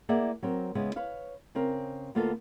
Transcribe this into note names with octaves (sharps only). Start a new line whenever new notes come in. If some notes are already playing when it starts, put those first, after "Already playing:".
A#3 E4 G#4 D5 E5 F#5
F#3 C4 A#4
C#3 G#3 B3 E4
B4 C#5 F5
C#3 C4 A#4
D2 A#3 B3 F4 A4